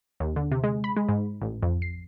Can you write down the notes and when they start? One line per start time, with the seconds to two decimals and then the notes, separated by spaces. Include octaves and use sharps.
0.20 D#2
0.36 D3
0.52 C3
0.64 G#3
0.84 B5
0.97 G#3
1.09 G#2
1.42 A1
1.62 F2
1.82 C7